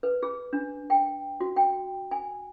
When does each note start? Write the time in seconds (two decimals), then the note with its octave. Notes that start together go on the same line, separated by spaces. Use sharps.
0.03 B4
0.23 G#4
0.53 D4
0.90 G5
1.41 F#4
1.56 G5
2.11 G#5